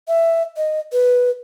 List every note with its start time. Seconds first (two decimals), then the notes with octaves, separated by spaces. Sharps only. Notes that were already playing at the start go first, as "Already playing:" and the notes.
0.08 E5
0.57 D#5
0.92 B4